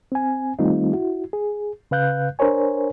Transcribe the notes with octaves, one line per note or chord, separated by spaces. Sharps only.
C4 G#5
D#3 G3 A3 C4 D#4 F4
E4 F#4
G#4
C#3 B4 F5 F#6 G6
D4 A#4 C5 C#5 G#5